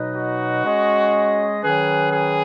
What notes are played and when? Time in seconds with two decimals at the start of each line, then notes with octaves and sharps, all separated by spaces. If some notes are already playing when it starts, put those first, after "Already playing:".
Already playing: B2 F#3 D#4 B4 D#5
0.16 F#4
0.65 G#3 C#4 G#4 D#5
1.63 D#3 F#3 C#4 G#4 B4
2.11 G#4